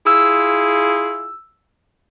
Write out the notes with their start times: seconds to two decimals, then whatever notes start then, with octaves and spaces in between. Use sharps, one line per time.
0.07 E4 F4 G#4 E6